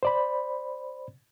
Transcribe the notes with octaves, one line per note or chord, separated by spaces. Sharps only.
C5 D5 B5